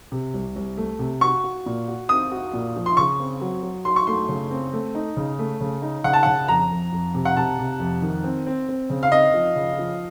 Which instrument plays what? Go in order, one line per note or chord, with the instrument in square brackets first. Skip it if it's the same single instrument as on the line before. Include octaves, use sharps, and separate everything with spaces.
[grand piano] C3
C2
C2
A3
C3
[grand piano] F#4 [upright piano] C#6
[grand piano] F#4
A#2
F#4
[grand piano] C4 [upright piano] D#6
[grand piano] F#4
A#2
F3
[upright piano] C6
[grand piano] C#3 [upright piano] C#6
[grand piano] C4
F#3
F#3
[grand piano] F#3 [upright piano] C6
[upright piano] C#6
[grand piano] A3 [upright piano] C6
[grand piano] C#3
C4
A3
D#4
C#3
A3
C#3
D#4
[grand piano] C#3 [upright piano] F#5
[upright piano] A5
F#5
[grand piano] C#3
[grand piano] F2 [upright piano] A#5
[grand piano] F2
F2
C3
[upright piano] F#5
[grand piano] C3 [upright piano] A5
[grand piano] C3
F2
D#3
C4
C4
C4
C#3
[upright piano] F5
[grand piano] C4 [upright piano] D#5
[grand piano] F3
C#3
F3